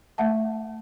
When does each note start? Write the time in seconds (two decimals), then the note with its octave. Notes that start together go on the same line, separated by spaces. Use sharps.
0.18 A3 E5 F#5 A5